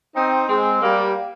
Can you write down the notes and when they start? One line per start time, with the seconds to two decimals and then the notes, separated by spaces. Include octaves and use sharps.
0.15 C4 D#4
0.49 G#3 C4
0.82 G3 A#3